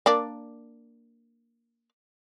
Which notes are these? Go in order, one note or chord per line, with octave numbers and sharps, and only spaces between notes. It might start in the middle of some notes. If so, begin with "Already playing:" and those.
A#3 D4 D5